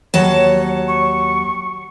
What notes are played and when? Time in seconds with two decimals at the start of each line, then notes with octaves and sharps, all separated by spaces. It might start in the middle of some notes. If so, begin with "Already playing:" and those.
0.14 D#2 F#3 C#5 A5
0.88 C#6